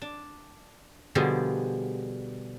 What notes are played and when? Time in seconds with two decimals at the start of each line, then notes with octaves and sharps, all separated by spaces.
0.02 D4
1.15 B2 D3 F3 G3 G#4